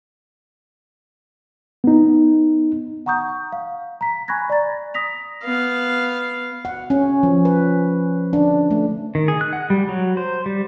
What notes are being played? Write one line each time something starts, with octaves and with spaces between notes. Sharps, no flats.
B3 D#4
F#5 A#5 C#6 D#6 G6
F5
A#5 B6
G#5 B5 C#6 F#6 G#6 A#6
D5 A#5 A6
D#6 A#6 B6 F7
B3 F5
F#5
C#4
F3
B4
D4
A3
D#3
G#4
F#6
F#5
G3
F#3
C5
G3